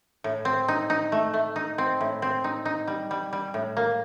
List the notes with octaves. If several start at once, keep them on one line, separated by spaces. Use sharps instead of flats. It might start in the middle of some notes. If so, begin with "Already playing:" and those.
A2
C4
D#4
D#4
A3
A3
D#4
C4
A2
C4
D#4
D#4
G3
G3
G3
A2
A#3